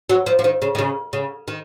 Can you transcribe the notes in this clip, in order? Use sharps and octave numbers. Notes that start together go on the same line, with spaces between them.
F#3
F3
F3
D#3
C#3
D#3
C#3
C#3
D#3